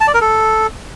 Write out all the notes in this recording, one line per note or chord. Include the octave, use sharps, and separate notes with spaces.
A5
D5
A#4
A4